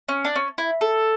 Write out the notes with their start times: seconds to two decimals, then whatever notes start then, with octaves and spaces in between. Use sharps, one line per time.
0.08 C#4
0.25 D4
0.36 C#4
0.58 E4
0.81 A4